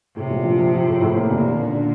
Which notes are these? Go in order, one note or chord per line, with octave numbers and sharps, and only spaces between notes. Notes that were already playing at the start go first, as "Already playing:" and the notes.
A2 C3
A#1
F3
F3
F3
A2
A2
A#3
F1 A#2
D#2
D3
D3